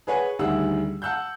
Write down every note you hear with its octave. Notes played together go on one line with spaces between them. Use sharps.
G#4 B4 C#5 F#5 G#5
D2 D#3 G3 G#4 F#5 E6
F#5 A5 E6 F#6 G6